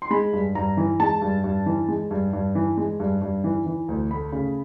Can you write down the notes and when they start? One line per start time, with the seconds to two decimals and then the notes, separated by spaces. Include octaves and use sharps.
0.02 C6
0.11 G#3 B5
0.33 G2
0.55 G2 A#5
0.77 E3
1.00 G#3 A5
1.22 G2
1.44 G2
1.66 E3
1.89 G#3
2.11 G2
2.33 G2
2.55 E3
2.77 G#3
3.00 G2
3.22 G2
3.44 E3
3.66 E3
3.88 D2
4.11 A3 B5
4.32 C#3